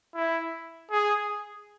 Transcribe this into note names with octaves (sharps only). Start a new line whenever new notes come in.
E4
G#4